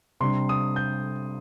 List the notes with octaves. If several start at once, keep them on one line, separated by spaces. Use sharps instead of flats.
C3 G3 D4 C6
D#6
G6